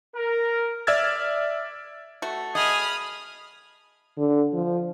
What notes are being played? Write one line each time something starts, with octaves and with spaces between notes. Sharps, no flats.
A#4
D5 E5 E6 F6 G#6 A6
A3 F#4
G#4 D#5 B5 D#6 F6
D3
F3